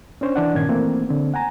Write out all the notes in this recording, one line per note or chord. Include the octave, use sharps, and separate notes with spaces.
C#4 D4 C5 C#5
E3 D4 F#5
G2 A#2 D#3 C#4 G#6
E3 A3 A#3 C4
D3 C4
F#5 G#5 A#5